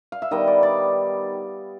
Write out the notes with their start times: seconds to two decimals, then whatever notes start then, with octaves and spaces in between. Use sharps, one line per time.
0.12 F5
0.22 E5
0.31 D#3 G3 B3 D#5
0.47 D5
0.63 D5